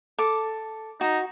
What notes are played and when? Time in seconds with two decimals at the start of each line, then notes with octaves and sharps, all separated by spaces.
0.18 A4 D6
1.01 D#4 F#4